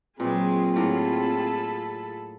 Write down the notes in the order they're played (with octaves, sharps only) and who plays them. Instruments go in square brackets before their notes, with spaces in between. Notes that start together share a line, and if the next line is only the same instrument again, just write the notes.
[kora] A#2 [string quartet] F#3 G#3 B4 [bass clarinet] C4 [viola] F4 G#4
[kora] A2 F#3 A#3 [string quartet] A4 B5